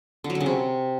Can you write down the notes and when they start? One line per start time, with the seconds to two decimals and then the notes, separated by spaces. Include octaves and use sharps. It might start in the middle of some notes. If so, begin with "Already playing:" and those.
0.24 D3
0.30 F#3
0.35 D3
0.41 C#3
0.46 C3